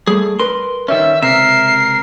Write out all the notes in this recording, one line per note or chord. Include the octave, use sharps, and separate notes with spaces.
G3 A3 G#4
A#4 B4 C6
D#3 G3 C#4 E5
C#2 C3 A#4 E5 C7